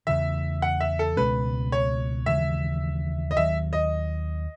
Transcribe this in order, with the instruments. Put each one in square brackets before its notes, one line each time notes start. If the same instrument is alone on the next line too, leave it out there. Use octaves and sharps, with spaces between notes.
[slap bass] E2 C#3 E3 [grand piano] E5
[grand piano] F#5
E5
A4
[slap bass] C#2 B2 G#3 C#4 [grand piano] B4
[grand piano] C#5
[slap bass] D#2 C#3 E3 G#3 [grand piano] E5
[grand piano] D#5
[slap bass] D#2 D#3 F#3 [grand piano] E5
[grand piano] D#5